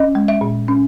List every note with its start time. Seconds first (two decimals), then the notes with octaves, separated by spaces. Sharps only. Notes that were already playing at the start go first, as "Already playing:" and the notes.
Already playing: C#4 D#5
0.15 G#3
0.28 E5
0.41 A#2
0.68 C#4